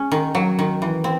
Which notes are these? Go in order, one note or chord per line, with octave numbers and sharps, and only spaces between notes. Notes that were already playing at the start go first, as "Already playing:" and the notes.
Already playing: G#3 C#4
D#3
F#3
D#3
E3
C4